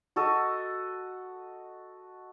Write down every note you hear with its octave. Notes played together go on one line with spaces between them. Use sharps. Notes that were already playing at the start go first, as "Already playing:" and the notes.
F#4 A4 D#5